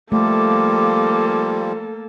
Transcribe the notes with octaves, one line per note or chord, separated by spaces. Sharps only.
F3 G3 A3 A#3 A4 D6